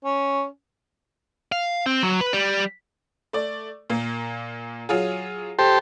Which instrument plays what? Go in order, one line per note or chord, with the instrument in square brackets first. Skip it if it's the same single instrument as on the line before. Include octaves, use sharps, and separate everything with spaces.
[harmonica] C#4
[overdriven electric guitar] F5
C4
F#3
B4
G3
[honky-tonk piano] A3 D5
A#2 A#3
F#3 F4 G#4
[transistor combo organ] G4 A4 C5